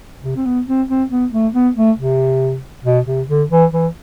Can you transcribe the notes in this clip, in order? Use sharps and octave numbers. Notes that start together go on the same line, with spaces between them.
C3
C4
B3
C4
C4
B3
A3
B3
A3
C3
B2
C3
D3
E3
E3